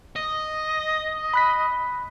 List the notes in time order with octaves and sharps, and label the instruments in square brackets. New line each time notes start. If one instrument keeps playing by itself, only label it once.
[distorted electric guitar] D#5
[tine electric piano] B5 F#6 B6